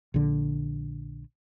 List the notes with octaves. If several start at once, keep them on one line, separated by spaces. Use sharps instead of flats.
A#1 D3